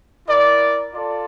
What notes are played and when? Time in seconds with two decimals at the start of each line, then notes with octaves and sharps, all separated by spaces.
0.27 E4 A#4 D5
0.94 F4 A4 D5